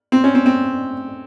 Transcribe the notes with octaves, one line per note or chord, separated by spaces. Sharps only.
C4
C#4
C4
C4